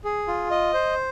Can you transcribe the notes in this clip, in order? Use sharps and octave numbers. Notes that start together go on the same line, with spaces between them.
G#4
F4
D#5
C5